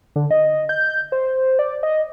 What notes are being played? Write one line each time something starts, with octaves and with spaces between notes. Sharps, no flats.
D3
D#5
G6
C5
D5
D#5